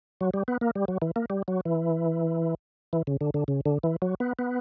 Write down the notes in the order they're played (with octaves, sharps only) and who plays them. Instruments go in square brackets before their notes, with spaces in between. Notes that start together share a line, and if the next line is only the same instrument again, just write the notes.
[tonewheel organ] F#3
G3
B3
A#3
G3
F#3
E3
A#3
G3
F#3
E3
E3
C#3
D3
D3
C#3
D3
E3
F#3
B3
B3